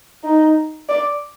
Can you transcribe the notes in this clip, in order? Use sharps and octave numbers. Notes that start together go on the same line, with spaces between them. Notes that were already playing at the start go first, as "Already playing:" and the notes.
D#4
D5